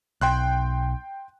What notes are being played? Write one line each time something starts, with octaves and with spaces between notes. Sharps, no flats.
B1 G5 C6 F#6